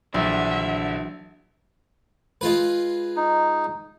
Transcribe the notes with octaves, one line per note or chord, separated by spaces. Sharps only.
A#1 D3 E3 F#3 D4 E5
G#3 F4 B4
D#4